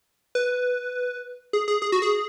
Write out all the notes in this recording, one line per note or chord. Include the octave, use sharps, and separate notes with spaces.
B4
G#4
G#4
G#4
F#4
G#4